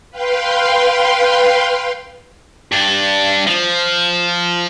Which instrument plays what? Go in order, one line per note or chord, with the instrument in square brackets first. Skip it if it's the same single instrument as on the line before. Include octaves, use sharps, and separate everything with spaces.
[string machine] B4 F5 G5 C6
[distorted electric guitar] G2 D4
F3